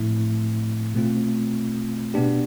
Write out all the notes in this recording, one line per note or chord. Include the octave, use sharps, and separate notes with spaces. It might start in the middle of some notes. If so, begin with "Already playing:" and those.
Already playing: A2 F3 A3 C4 E4
B2 A3 C4 F4
B2 B3 D4 G4